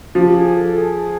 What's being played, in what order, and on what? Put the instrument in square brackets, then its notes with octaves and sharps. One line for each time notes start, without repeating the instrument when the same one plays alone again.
[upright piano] F3 [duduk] G4
[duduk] G#4
A4
G#4